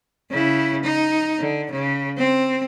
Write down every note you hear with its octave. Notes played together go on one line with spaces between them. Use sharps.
C#3 E4
D#4
D3
C#3
C4